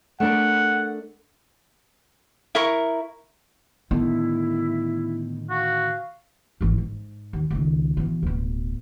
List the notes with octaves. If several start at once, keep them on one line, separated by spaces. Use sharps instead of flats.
A3 D4 A#4 F#5
E4 A#4 C#6
A2 D3 D#3 B3 E4
F#4 F5
G#1 E3
G#2
D#2
C#2 D#3
B2 E3
D1 B2